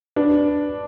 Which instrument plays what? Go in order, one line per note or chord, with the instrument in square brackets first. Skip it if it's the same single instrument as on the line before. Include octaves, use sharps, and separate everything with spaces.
[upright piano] D4 [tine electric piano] B4